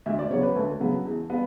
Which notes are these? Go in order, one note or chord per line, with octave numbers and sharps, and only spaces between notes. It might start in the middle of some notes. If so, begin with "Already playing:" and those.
D2 E5
D5
C#3 F#3 B3 C#5
B4
D2 A4
C#3 F#3 B3
E2
G3 B3